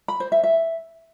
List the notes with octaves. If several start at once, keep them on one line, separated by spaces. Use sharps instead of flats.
B5
C5
E5
E5